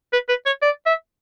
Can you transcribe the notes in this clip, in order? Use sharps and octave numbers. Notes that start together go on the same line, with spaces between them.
B4
B4
C#5
D5
E5